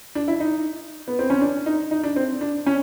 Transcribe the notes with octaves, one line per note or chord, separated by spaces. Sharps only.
D4
E4
D#4
B3
C4
C#4
D4
D#4
D#4
D4
C4
D4
C#4